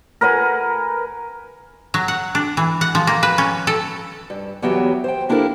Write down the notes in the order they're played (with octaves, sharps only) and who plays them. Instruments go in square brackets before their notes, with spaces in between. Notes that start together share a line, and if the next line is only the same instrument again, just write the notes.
[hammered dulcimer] A#4 B4 F#5 G#5
[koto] F#3
F#5
D4
E3
F#5
F3
A#3
B4
C#4
A4
[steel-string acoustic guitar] G2
E2 F#3 B3 G4 C#5 E5
C5 G5
A#3 D4 E4 G4 A4 A#4